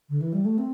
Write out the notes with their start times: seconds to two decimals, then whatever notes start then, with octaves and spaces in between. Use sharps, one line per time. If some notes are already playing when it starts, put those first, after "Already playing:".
0.10 D3
0.21 E3
0.33 G3
0.45 A3
0.58 C4